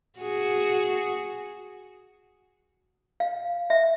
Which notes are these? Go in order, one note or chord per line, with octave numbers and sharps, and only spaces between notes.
F#4 G#4
F5
E5